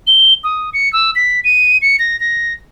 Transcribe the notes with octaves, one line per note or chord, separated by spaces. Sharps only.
G7
D#6
C#7
E6
B6
D#7
C#7
A#6
A#6